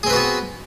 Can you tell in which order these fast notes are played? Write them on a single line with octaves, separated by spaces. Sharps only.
G#4 C4 B4 F#4 B3